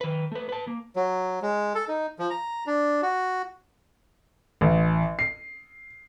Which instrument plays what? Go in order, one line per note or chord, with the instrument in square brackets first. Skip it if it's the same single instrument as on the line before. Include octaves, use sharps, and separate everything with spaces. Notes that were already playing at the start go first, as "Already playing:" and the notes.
[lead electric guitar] D#3 B4
A3 B4
B4 A5
A#3
[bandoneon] F#3
G#3
A4
D#4
F3
A#5
D4
F#4
[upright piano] A1
C7